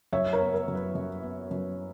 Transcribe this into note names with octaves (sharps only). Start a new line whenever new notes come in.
F#2 C#5 E5
A#4 C#5
B3
A#4
F#2
B4
F#2
B3
F#2